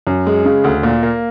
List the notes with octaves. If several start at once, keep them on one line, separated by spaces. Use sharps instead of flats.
F#2
G#3
C#3
D2
A#2
A#3